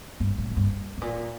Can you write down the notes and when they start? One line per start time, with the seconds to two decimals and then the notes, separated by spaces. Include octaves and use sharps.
0.20 G2
0.38 A2
0.51 F2
0.57 G2
0.97 A2
1.01 A#2